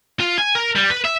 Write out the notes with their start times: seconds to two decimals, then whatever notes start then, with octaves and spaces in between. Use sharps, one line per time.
0.20 F4
0.38 G#5
0.55 A#4
0.75 G3
0.90 B4
1.04 E5